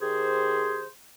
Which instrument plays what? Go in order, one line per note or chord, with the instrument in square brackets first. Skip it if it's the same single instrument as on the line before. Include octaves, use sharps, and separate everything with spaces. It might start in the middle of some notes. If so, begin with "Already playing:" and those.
[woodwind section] D#3 G4 G#4 C5